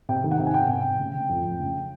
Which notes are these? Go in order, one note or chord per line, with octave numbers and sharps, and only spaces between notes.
C3 G5
D#3
F#5
C3
G#5
C3 G5
C3
C3
C#3
C#3
F2
F2
C#3